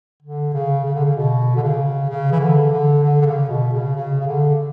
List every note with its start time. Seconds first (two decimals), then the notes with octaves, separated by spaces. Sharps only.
0.22 D3
0.54 C#3
0.85 C#3
0.95 D3
1.05 C#3
1.16 B2
1.56 D3
1.63 C#3
2.09 C#3
2.32 E3
2.40 D3
2.72 D3
3.03 D3
3.21 D3
3.26 C#3
3.49 B2
3.73 C#3
3.96 C#3
4.20 C#3
4.27 D3